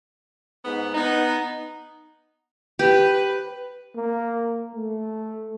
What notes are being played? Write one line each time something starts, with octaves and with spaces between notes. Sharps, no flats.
G#2 B3
B3 D#4
G4 B4
A#3
A3